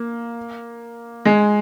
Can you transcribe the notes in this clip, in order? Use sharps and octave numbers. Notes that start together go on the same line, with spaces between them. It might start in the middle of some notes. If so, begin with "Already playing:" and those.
Already playing: A#3
G#3